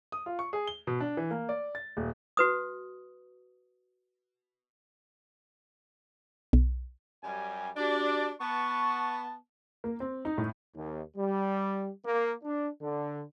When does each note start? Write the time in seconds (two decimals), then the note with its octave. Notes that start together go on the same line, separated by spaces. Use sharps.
0.12 D#6
0.26 F4
0.39 C#6
0.53 G#4
0.67 G7
0.87 B2
1.00 D4
1.17 E3
1.31 A#3
1.49 D5
1.75 A6
1.97 D#1
2.37 F#4 B4 D#6
6.53 B1
7.24 F#2 G3 G#5
7.77 D4 F#4 G4 D5
8.41 B3 A5 C#6
9.84 A#3
10.00 C4
10.25 D#4
10.38 A2
10.75 D#2
11.17 G3
12.05 A#3
12.44 D4
12.82 D3